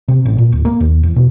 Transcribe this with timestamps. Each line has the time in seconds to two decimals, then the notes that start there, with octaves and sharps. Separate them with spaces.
0.08 C3
0.25 A1
0.38 A#2
0.52 D1
0.65 A#3
0.80 D#2
1.03 E2
1.16 B2